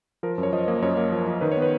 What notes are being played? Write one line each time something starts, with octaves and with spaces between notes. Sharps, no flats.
F3 A#4
F#2
C#5
F3 D#5
A#3
F#2 C#5
A#3
F3
F3
D#3 B4
C#5
B3
B4